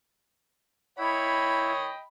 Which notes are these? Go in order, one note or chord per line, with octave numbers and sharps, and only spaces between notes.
E4 C#5 D#5 G5 B5